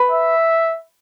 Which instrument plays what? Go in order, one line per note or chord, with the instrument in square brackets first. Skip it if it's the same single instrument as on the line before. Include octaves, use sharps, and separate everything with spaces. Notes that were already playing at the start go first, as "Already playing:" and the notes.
Already playing: [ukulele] B4
[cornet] E5